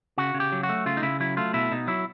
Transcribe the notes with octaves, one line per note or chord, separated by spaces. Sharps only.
C#3 F#4
C#3
G4
F#3
F#4
A3
C#3 F4
D#4
C#3 E4
F#3 E4
A3 F4
B2 E4
B2 D#4
F#3 E4